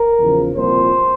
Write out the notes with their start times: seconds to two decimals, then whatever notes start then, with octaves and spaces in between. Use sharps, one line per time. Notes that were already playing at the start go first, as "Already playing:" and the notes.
Already playing: A#4
0.17 E2 C#3 F3
0.55 C2 A#2 F3 C5